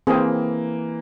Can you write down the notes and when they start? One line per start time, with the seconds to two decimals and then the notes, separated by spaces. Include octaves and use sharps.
0.07 E3 A#3 C4 G#4